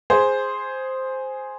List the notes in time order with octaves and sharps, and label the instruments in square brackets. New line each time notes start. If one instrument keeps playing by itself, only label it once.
[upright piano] G#4 C5